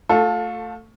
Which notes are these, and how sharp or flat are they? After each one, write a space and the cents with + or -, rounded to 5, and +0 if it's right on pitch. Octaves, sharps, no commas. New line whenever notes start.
A3 +15 F4 +30 A4 -5